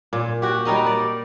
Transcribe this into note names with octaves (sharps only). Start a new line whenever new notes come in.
A#2
F#4 G4
G3 D#4 A#4 D#5
D5